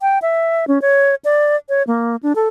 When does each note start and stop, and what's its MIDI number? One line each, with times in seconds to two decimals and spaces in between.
0.01 0.19 79
0.22 0.65 76
0.68 0.81 61
0.82 1.15 73
1.25 1.56 74
1.69 1.83 73
1.87 2.16 58
2.23 2.33 62
2.35 2.48 69